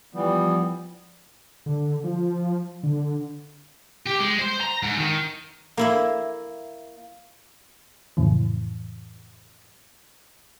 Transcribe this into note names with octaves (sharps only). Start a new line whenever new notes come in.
E3 F3 G3 B3
D3
F3
D3
G4
G#3
C5
A#5
G#2
D#3
A#3 E4 E5
F2 A2 C#3 E3